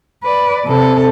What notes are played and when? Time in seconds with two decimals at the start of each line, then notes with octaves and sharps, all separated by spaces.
0.23 B4 D5
0.65 C3 A4